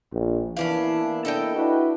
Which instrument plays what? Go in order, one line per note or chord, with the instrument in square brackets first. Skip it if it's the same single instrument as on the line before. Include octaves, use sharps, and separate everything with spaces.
[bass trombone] A#1
[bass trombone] E3 [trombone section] A#3 B3 E4 [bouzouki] C#4 D4 F5
[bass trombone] D4 [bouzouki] A4 D#5 G5
[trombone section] D4 F#4 B4 [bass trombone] E4